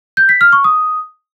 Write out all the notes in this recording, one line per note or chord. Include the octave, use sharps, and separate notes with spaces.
G6
B6
F6
C#6
D#6